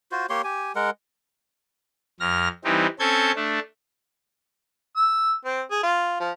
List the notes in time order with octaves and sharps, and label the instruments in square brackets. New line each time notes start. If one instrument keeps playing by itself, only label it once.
[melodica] F4 F#4 C5
A#3 G4 C#5 C6
G4 G#5
G#3 A#4 F#5
[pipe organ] F2 F6 A#6
E3 G3 C4 D#4 G4
C4 C#4 A4 A5 G6 G#6
A3 D4
[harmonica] E6
C4
G#4
F4
F3